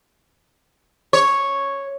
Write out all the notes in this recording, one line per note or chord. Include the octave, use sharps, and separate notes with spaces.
C#5